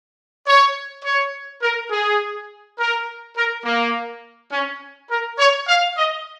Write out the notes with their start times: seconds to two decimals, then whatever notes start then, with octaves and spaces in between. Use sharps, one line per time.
0.47 C#5
1.05 C#5
1.63 A#4
1.92 G#4
2.79 A#4
3.36 A#4
3.65 A#3
4.52 C#4
5.10 A#4
5.39 C#5
5.68 F5
5.97 D#5